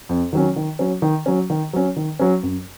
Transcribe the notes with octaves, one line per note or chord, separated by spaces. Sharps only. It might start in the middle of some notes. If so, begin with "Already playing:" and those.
F2
D#3 F#3 C#4
D#3
F#3 C#4
D#3
F#3 C#4
D#3
F#3 C#4
D#3
F#3 C#4
F#2